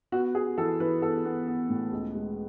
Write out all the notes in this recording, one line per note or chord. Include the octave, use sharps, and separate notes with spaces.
B3 F#4
B3 G#4
E3 A4
E3 B4
B3 A4
B3
B3
A2
C#2
G#3